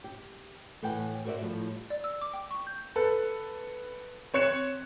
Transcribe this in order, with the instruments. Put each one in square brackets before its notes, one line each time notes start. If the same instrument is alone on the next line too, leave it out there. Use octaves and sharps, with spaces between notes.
[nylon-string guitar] G4
A2 E3 F#5 G5 A5
F#4 A#4 C5 D5 E5
A2 F3 G3
[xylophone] D5
E6
D6
G5
C#6
G6
[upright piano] A4 B4
C4 C#5 F#6 C#7 E7